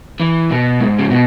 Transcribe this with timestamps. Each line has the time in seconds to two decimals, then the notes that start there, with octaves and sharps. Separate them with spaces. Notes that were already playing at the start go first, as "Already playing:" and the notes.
0.20 E3
0.51 B2
0.80 G#2
0.99 C#3
1.10 B2